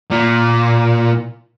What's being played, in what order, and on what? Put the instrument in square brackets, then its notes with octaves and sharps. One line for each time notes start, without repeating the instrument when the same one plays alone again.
[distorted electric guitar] A#2